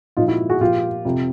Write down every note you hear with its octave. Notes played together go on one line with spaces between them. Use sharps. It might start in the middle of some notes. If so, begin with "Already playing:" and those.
A#2 F3 D#4 F4
E4 F#4
F#4 G#4
A#2 F3 F4 G4
F2 C3 F3